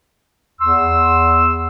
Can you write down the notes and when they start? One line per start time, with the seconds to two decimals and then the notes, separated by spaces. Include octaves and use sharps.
0.61 E2 C6 E6